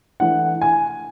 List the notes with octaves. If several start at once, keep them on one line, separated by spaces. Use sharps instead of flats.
E3 A3 D4 F#5
G#5